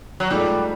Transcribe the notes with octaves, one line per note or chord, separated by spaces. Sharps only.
F#3
G#2 F3 G3 A3